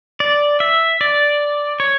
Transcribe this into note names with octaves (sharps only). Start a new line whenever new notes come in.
D5
E5
D5
C#5